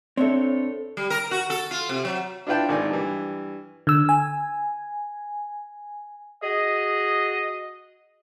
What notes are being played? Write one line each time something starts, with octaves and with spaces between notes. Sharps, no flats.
C4 D4 A4 C#5 E5
G3
A#4
F#4
A4
F4
C3
F#3
D4 E4 F4 B4 G5 A5
G#1 D#3 D5 G#5
G2 E3
D3 E6
G#5
F#4 G#4 D#5